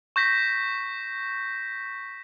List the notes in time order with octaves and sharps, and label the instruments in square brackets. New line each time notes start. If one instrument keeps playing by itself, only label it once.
[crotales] C#6 G6 A#6 B6